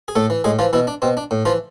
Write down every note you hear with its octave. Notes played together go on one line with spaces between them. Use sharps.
G#4
A2 A3 A4
E3
A2 G#3 G#4
E3 F3 F4
B2 E3 E4
D4
B2 C4
D4
A2
E3 F3 F4